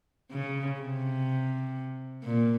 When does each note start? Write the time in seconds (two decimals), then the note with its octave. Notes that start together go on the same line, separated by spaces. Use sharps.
0.32 C#3
0.80 C3
2.24 A#2